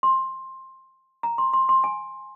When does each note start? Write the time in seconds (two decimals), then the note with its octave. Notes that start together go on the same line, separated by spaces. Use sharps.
0.03 C6
1.23 A#5
1.38 C6
1.53 C6
1.69 C6
1.84 G#5